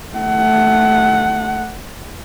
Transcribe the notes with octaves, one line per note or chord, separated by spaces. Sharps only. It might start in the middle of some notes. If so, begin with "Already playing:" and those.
A3 F#5